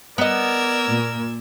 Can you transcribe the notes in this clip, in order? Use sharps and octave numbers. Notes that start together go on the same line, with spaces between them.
B3 A#4 D5 D#5 E6 G#6
A#2